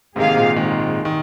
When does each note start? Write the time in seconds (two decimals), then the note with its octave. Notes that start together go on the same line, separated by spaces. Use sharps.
0.16 G#2 C3 D#3 A#3 G#4 F5
0.37 A#2
0.56 D#3 G#3
1.05 D#3